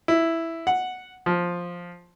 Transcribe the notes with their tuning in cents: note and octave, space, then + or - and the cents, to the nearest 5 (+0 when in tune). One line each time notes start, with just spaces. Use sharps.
E4 +0
F#5 -5
F3 +5